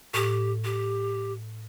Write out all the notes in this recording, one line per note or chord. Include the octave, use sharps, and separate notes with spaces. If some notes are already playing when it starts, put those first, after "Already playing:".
A2 G4
G4